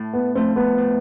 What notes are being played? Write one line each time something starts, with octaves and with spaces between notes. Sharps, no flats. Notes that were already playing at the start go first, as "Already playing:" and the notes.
Already playing: A2
B3
F3 A3 C4
B3
A2